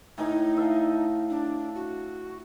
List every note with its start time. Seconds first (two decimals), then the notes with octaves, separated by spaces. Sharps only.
0.18 A2 D#4 G#5 A#5
0.57 E5 F5 A5
1.30 D4
1.75 F#4